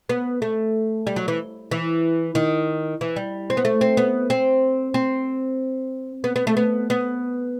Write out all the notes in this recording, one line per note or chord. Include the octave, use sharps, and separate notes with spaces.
B3
A3
G3
F#3
E3
E3
D#3
E3
G3
C4
B3
A3
C4
B3
C4
C4
B3
B3
A3
B3
B3